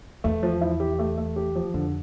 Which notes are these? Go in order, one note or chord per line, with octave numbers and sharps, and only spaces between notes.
E2 A3
F3
E4
G4
A3
A3
G4
F3
F2 D3